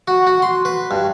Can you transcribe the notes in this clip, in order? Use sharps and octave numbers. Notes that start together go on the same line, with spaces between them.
F#4
F#4
C6
B4
G2